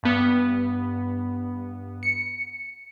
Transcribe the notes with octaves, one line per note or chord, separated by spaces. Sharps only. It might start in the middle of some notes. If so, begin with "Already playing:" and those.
G2 B3
C#7